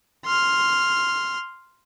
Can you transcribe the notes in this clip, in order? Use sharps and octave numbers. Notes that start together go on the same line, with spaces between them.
C6 F6